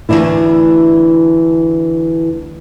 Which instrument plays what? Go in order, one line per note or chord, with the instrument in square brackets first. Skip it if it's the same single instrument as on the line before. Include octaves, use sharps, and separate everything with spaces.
[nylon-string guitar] D2 G#2 E3 D4 E4